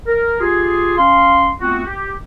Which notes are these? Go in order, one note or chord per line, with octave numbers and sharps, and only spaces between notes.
A#4
F4 G4 G#4
C#4 F5 C6
A3 B3 C4 F4 F#4
G4